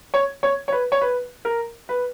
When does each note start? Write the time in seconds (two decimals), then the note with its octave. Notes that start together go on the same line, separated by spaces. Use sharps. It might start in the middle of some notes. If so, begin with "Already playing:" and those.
0.14 C#5
0.43 C#5
0.68 C#5
0.72 B4
0.92 C#5
1.01 B4
1.45 A#4
1.89 B4